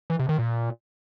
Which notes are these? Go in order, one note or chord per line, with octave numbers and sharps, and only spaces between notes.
E3
C3
D#3
A#2